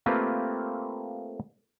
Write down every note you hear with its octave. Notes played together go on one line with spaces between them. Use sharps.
A3 A#3 C4 F4 G4 B4